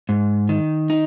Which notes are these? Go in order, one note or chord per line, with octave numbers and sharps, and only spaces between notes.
G#2
D#3
D#4